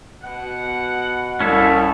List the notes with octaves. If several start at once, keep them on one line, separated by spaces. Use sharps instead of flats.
B2 F#5
C2 C#4 E4 A4